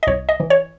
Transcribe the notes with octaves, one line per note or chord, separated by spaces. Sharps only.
D#5
C2 C#5
D#5
E3
C#5